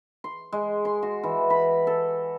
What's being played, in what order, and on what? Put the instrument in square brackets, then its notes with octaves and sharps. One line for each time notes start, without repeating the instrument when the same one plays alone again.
[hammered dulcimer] C6
G#3
C6
F#4
E3
B5
A4